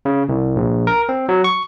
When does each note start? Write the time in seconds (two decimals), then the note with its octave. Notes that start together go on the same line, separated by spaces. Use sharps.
0.05 C#3
0.29 C2
0.56 A#1
0.87 A#4
1.09 C4
1.29 F#3
1.44 C#6